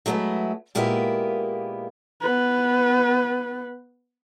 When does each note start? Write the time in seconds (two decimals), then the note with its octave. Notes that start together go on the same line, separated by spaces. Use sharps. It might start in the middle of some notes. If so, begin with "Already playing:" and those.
0.06 F#3 G#3 A3 B3 E4
0.75 A#2 G#3 A#3 B3 E4 G4
2.22 B3 B4